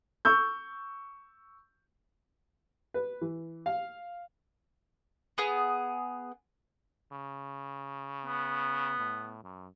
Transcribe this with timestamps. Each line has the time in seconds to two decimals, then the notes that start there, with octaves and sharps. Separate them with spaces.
0.25 C#6 E6 G6
2.94 B4
3.21 E3
3.66 F5
5.38 B3 G#4
7.12 C#3
8.26 B3
8.98 A2
9.43 F#2